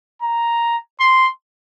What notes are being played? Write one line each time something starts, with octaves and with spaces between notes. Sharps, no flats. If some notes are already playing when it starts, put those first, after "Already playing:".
A#5
C6